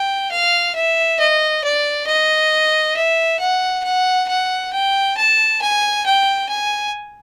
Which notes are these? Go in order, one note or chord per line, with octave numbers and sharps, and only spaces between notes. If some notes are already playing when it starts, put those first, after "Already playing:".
Already playing: G5
F5
E5
D#5
D5
D#5
E5
F#5
F#5
F#5
G5
A5
G#5
G5
G#5